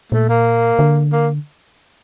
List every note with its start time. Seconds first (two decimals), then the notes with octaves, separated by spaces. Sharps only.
0.12 A#2 A3
0.29 A#3
0.79 D3
1.13 A#3